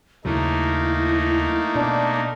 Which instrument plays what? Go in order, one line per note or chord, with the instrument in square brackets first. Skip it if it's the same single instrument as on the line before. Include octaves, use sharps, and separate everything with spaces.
[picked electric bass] D#2 C#3 F#3 [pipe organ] A3 A#3 D#4 [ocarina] E4
[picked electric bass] B2 [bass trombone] D4